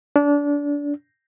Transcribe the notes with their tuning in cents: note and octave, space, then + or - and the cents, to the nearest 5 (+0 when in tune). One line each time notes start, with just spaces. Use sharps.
D4 -25